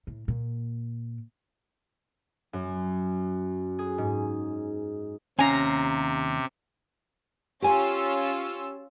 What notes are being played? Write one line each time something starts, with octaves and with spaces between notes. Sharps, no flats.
A2
A#2
F#2
G#4
G#2
D#2 C3 C#4 F5 G#5 A#5
C#4 F4 G4 G#5 E6